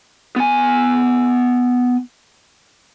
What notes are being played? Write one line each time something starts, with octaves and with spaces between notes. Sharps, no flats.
B3 G#5